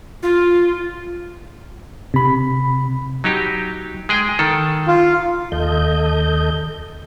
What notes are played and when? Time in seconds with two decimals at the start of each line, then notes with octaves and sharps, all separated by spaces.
0.23 F4
2.14 C3 B5
3.24 F#3 D#4 G4
4.09 G#3 G#4 G5
4.39 D#3 A4
4.88 F4
5.52 D#2 A4 D#5 G6